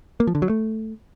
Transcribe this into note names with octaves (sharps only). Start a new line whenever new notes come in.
A#3
F3
D3
F#3
A3